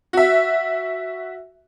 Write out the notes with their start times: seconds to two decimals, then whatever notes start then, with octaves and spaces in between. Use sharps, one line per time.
0.13 F#4 E5